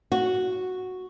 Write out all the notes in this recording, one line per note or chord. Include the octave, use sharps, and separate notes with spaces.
F#4